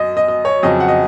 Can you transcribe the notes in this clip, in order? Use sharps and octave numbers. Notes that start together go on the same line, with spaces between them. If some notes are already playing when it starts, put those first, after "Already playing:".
Already playing: F#2 D#5
D#5
D#5
C#5
F2 C#3 F#3 D#5
F#5
D#5